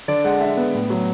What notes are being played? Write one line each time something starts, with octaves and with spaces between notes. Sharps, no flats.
D3 D5
G#3 F#5
D4 E5
B3
A2
F#3